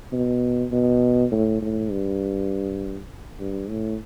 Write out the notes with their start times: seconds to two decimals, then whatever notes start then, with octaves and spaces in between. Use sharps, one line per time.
0.12 B2
0.72 B2
1.31 A2
1.62 A2
1.91 G2
3.40 G2
3.69 A2